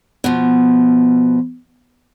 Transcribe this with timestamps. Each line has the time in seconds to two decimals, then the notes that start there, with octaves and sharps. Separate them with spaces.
0.24 B2 F3